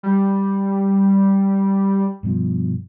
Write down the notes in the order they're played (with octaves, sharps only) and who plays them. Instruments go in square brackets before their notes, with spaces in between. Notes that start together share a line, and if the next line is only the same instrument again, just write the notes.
[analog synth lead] G3
[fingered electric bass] G2 B2 F3